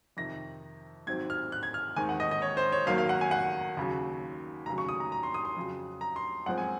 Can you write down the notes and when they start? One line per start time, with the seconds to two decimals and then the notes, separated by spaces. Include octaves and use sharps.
0.17 F2 C3 D#3 A#6
1.07 G#1 G#2 F#3 C4 G#6
1.30 F6
1.52 F#6
1.63 G#6
1.74 F6
1.96 D#2 D#3 G#3 C4 G#5
2.09 F#5
2.20 D#5
2.31 D#5
2.42 C#5
2.57 C5
2.72 C#5
2.86 G#1 F#2 D#3 F#3 A#3 F5
2.98 F5
3.09 F#5
3.21 G#5
3.31 F#5
3.77 D#2 C#3 F#3
4.66 F1 D#2 C#3 F#3 A#5
4.78 C#6
4.89 D#6
5.00 A#5
5.12 A#5
5.23 C6
5.34 D#6
5.45 C6
5.57 F2 C#3 F#3
6.01 A#5
6.16 C6
6.46 F#2 F3 G#3 C4 F#5
6.58 G#5